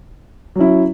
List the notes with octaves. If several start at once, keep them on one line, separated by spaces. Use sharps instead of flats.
F#3 C#4 E4